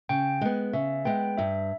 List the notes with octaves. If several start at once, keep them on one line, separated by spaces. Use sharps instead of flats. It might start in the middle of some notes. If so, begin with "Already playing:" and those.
C#3 G5
G#3 B3
C#3 E5
G#3 B3 G5
G2 E5